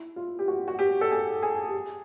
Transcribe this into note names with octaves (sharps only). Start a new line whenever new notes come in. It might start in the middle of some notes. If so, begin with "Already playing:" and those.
Already playing: E4
F4
G4
F#4
F#4
G4
A4
G#4
G#4
G4
G#4